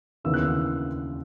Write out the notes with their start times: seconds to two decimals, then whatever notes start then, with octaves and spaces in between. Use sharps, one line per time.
0.24 D#2 C#3 E3 B3 E6
0.34 F#6
0.43 E6